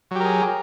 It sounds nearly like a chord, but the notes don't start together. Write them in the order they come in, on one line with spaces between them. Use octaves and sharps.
F#3 G4 A#4 G#4